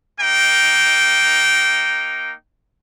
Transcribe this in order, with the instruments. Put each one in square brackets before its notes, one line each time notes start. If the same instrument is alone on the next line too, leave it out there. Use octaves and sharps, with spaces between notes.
[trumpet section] A#3 D#4 G5